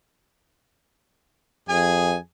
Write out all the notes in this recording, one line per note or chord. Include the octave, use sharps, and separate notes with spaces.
F2 G#4 G#5